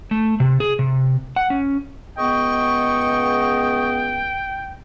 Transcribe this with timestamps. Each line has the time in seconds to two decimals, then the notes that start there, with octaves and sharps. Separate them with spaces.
0.11 A3
0.40 C3
0.60 G#4
0.79 C3
1.36 F#5
1.50 C#4
2.18 C#2 B3 D#5 G5 C#6